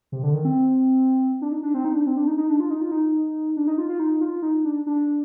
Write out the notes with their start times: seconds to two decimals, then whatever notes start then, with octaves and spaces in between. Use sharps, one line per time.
0.12 C3
0.23 D3
0.33 D#3
0.45 C4
1.42 D4
1.51 D#4
1.63 D4
1.74 C4
1.85 D#4
1.95 D4
2.06 C4
2.17 D4
2.27 D#4
2.38 D#4
2.50 D4
2.60 F4
2.70 D#4
2.81 F4
2.91 D#4
3.57 D4
3.67 D#4
3.78 F4
3.89 F4
3.99 D#4
4.21 F4
4.42 D#4
4.65 D4
4.86 D4